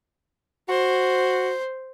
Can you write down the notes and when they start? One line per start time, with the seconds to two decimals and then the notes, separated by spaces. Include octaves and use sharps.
0.69 F#4 C5